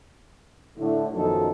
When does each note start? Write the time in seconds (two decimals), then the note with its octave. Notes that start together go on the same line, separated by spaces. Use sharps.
0.77 A2 D3 A3
1.13 B1 F#2 D#3 F3 D#4 A4